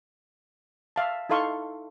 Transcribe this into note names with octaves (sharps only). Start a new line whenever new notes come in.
E5 F5 A5
D#4 E4 A4 F5 C6 C#6